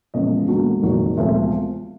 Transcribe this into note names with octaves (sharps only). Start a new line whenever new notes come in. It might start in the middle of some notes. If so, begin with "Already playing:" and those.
E1 E2 C#3 F3 D#5
E1 D#2 D3 F#3
F#1 F2 C3 D#3 F#3
E1 D2 C3 F3